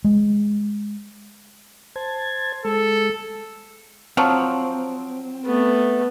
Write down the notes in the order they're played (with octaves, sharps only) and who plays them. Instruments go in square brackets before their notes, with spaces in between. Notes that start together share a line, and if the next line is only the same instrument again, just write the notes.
[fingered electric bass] G#3
[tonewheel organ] C5 A5 G#6
[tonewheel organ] G#3 [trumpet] A4
[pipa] F3 F#3 [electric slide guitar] C4
[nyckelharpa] A3 B3